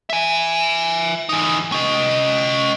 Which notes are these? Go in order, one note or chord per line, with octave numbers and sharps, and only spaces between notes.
E5 G#5
E3 D#4
C#4 D#5